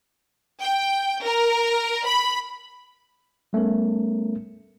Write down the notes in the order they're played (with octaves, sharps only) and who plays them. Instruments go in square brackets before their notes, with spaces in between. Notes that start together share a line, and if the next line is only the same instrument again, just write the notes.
[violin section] G5
A#4
B5
[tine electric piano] G3 A3 B3 C#4 A#4